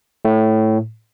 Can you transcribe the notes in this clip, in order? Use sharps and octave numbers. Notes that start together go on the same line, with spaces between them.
A2